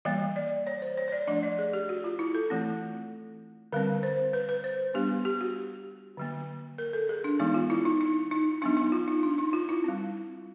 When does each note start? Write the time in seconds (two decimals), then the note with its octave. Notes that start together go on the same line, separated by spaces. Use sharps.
0.05 E3 G3 A#3 D#5
0.36 D5
0.67 C#5
0.82 C5
0.97 C#5
1.08 C#5
1.12 D5
1.27 F3 A3 D4 D#5
1.43 D5
1.59 G#4
1.73 G4
1.89 F#4
2.04 F4
2.19 E4
2.35 A4
2.50 E3 A3 C4
3.72 D3 G3 C4 A#4
4.03 C5
4.33 B4
4.49 B4
4.64 C5
4.94 G3 B3 D4 G4
5.25 G4
5.41 F#4
6.17 D3 F#3 A#3
6.78 A#4
6.93 A4
7.09 G#4
7.24 D4
7.39 E3 G#3 B3 D#4
7.54 F4
7.70 E4
7.85 D#4
8.01 D#4
8.31 D#4
8.62 F#3 B3 D4 D#4
8.77 D#4
8.92 F4
9.08 D#4
9.23 D4
9.38 D#4
9.53 F4
9.69 E4
9.84 G3 C4